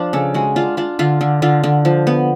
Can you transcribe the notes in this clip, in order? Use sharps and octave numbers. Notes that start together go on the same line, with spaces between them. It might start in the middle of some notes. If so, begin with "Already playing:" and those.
Already playing: F3 D4 F4
C#3 A4
G#3 F#4
D4 F4
D4 F4
D3 F4
D3
D3 F4
D3
F3
B3